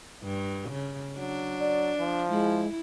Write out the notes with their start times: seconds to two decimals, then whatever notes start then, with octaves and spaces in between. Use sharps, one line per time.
0.23 G2
0.70 C#3
1.18 F#3 D4
1.60 D5
1.99 F3
2.30 G#3 E4